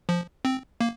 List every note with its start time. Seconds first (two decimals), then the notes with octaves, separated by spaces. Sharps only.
0.09 F3
0.45 C4
0.80 A#3